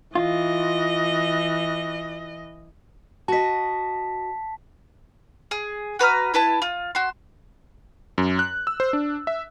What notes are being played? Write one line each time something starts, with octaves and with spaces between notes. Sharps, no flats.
E3 F4 D#5
F#4 D#5 A5 B6
G#4
F#4 B4 A#5 F6
E4 B4 A5
F4
F#4 C6
F#2
F#6
E6
C5
D4
E5